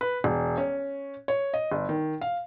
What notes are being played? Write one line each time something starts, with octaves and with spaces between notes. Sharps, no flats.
B4
E1
C#4
C#5
D#5
G1
D#3
F5